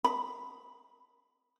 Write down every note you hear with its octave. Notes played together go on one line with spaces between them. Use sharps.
B5